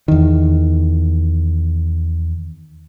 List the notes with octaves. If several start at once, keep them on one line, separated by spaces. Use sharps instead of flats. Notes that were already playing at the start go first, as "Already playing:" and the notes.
E2 D#3